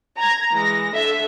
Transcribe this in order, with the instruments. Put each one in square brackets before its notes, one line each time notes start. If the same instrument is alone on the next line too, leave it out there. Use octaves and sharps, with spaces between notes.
[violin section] A#5 G#6
[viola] E3 G#3 [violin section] A#6
[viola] D3 A4 [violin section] E5